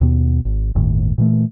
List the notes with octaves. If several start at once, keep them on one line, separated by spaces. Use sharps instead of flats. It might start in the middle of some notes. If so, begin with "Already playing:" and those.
D#2 B2 B3
G#1
G1 D#2 A2 D#3
A#2 E3 A3